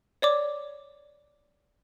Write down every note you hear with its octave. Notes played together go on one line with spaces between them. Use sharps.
C#5 D5 D6